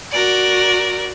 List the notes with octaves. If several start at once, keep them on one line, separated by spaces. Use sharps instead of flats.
F#4 A#4 D5